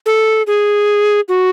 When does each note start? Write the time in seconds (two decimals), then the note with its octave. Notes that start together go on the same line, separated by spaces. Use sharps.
0.06 A4
0.47 G#4
1.28 F#4